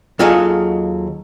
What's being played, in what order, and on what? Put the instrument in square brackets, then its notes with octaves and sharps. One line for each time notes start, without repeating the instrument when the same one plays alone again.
[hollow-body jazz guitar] D#2 F#3 F4 G#4 A4 D#5